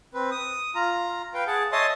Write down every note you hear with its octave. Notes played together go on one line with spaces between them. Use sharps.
C4 B4
D#6
F4 A#5
B4 F5 G5
G#4 F#5 A5
C#5 D#5 E5 A5 C6 D#6